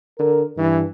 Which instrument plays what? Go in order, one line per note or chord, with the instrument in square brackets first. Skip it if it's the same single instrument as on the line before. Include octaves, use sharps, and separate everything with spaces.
[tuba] D3 [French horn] A#4
[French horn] G2 [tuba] E3